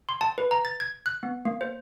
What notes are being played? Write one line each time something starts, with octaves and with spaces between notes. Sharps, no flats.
C6
A5
B4
A#5
A6
G#6
F#6
B3
A#3
C5